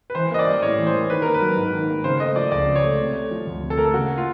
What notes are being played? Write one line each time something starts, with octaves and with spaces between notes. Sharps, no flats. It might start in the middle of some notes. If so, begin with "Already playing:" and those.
B4
E3 C5
A#3 D#5
D5
G3
A2 C#5
E3
C5
A#3
D#3 B4
A#3 A#4
B4
F#3
G#2
D#3
A#3
C#3 C5
A3 D#5
F3 D5
C#2 D5
C#3
C#5
A3
C3
A3
F3
D2
C3
A4
A3 A#4
A4
C#3 F#4
A#3
F4